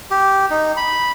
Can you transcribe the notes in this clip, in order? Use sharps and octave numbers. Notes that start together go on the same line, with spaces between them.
G4
D#4
B5